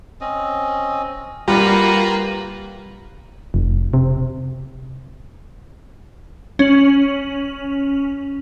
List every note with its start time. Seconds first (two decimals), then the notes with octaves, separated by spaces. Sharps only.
0.21 C4 C#4 D#5
1.48 G3 A#3 F4 B4 F#5 G5 A#5
3.54 F1
3.93 C3
6.59 C#4 F#7